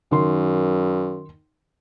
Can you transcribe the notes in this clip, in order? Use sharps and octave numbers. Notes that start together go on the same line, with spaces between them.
F#2 D#3 C6